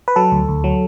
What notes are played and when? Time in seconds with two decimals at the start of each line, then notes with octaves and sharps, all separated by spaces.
0.08 B4
0.16 F#3 A4
0.32 D2
0.48 D2
0.64 F#3